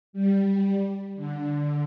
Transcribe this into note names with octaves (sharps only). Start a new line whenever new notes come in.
G3
D3